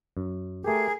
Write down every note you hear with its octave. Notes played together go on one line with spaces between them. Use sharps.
F#2
A3 G4 G#4 A#4